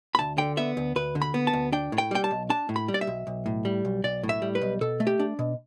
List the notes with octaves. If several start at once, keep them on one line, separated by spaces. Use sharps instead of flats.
B5
D2 A5
D3 G5
B3 E5
D2
D2 B4
D3
B5
B3
A5
D2
D4 G5
A2
G5
G3 G5
A5
B1
D4 A5
A2
B5
G3
D5
E5
B1
B1
A2
G3
B1
B1 D5
A2
E5
G3
B4
B1
B2 A4
A3
G4
D4
B2